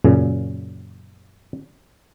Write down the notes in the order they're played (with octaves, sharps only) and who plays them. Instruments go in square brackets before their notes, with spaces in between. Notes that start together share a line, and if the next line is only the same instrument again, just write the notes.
[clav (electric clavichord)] F#2 A#2 C#3